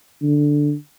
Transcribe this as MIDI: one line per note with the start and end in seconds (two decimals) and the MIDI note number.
0.22 0.74 50